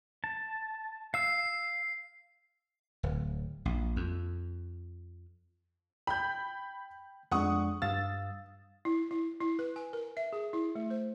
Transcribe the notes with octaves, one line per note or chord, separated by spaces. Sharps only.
A5
F5 E6 C7
D1
A#1
F2
G5 B5 G6
F2 G#3 D4 F#5 C#6 D#6
G2 F5 E6 A6
E4
E4
E4
B4
G#5
A#4
E5
G#4
E4
A3
C5